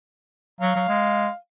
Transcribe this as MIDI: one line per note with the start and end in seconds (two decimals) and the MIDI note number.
0.61 0.76 54
0.61 1.36 77
0.76 0.85 54
0.89 1.28 56